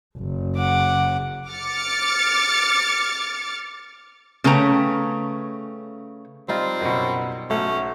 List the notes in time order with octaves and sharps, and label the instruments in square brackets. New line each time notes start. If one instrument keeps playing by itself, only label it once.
[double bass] F#1
[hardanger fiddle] F#5 D6
[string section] D6 F6 A6 C#7
[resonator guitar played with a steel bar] C#3 A3 C#4 B4 G5 A#5
[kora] G3 D#4 F4 [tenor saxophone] C4
[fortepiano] F#2 B2
[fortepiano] B1 [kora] A3 [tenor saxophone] C#4